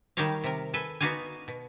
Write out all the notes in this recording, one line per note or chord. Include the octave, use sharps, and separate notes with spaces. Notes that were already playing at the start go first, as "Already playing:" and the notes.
D#3 G3 A#4 C#5 F5
C3 A#4
A4 B4 G#5
B3 D#4 F#4 D5 F5 G#5
B2